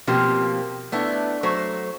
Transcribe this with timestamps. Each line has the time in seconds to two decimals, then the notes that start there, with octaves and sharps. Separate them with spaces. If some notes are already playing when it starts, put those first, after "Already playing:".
0.07 B2 F3 A#3 C4 G4
0.92 A3 B3 D4 E4
1.43 F#3 A3 C5